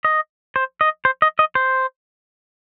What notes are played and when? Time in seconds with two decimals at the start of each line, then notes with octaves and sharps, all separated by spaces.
0.05 D#5
0.56 C5
0.81 D#5
1.05 C5
1.22 D#5
1.39 D#5
1.55 C5